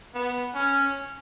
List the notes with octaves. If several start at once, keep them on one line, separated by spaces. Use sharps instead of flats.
B3
C#4